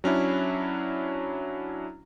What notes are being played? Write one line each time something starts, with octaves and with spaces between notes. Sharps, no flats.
F#3 C#4 D4 E4